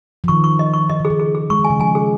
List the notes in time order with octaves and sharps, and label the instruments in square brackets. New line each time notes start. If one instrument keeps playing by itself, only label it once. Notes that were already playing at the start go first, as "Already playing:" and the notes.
[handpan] F3
[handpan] D#3 [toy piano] C#6
[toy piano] C#6
D#5
C#6
[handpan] D#3 [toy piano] D#5
[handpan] C#3 [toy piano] G#4
[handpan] D#3
[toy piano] G#4
G#4
[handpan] G#3 [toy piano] C#6
[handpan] D#3
[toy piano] G#5
[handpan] C#3
[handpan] F3 [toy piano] G#5
[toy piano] G#4